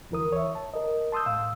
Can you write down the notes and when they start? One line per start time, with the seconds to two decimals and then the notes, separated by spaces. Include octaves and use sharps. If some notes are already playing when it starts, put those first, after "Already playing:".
0.11 D2 E3 A#4 D#6
0.32 C#5 E5
0.55 A5
0.74 A#4 D#5
1.12 A5 C6 D#6 E6 G6
1.26 A2 F5 E6